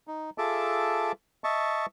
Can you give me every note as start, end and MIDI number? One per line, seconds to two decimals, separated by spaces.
0.07 0.30 63
0.38 1.12 65
0.38 1.12 68
0.38 1.12 69
0.38 1.12 76
0.38 1.12 81
0.38 1.12 86
1.44 1.86 75
1.44 1.86 76
1.44 1.86 81
1.44 1.86 85